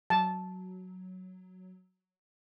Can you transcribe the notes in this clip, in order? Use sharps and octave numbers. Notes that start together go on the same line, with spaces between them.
F#3 A5